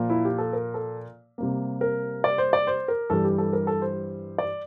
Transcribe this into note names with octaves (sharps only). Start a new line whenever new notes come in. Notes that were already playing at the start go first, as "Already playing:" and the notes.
Already playing: A#2 F3 A#3
E4
G4
A4
A#4
A4
C3 G3 A#3
A#4
D5
C5
D5
C5
A#4
G2 E3 G3 A4
G4
A4
A#4
A4
C5
D5